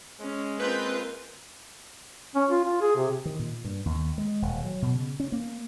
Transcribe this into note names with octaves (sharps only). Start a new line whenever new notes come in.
G#3 C#4
A#3 C4 F4 A#4 B4 G6
C#4
F4
F4
G#4
C3
D#3
A#2
G2
D#2
G#3
D#1
F#3
B2
C#3
C#4
A#3